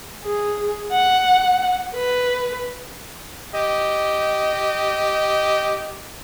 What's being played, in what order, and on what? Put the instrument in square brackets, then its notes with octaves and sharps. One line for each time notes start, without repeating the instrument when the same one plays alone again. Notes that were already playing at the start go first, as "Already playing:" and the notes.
[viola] G#4
F#5
B4
[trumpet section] G4 D#5